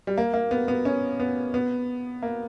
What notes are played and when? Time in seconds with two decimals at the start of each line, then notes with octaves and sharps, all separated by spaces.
0.07 G3
0.17 A#3
0.34 A#3
0.51 B3
0.68 B3
0.85 C#4
1.20 B3
1.54 B3
2.22 A#3